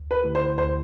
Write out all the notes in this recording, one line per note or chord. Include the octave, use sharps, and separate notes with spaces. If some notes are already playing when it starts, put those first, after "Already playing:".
Already playing: D2
B4
D3 A3 E4 G4
C5
D2 C5